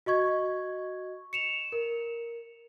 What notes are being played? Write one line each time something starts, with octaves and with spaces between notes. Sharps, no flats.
F#4 D#5 C#6 G#6
C#7 E7 F7
A#4